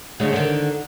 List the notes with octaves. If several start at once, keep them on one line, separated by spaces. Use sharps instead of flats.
D2 C#3 G#3
D3 D#3